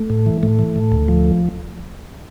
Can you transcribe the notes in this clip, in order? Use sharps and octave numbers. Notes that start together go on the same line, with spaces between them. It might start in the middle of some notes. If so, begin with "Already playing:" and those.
Already playing: A3
A2
E3
A2 A3
E3
A2
D2
F3